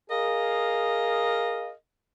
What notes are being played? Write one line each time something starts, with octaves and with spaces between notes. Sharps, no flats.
G#4 A#4 D#5 F5